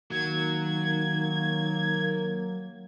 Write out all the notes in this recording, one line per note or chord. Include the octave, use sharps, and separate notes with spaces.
D#3 F#3 A#3 G#6